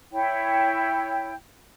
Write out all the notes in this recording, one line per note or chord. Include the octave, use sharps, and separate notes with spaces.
E4 C#5 G5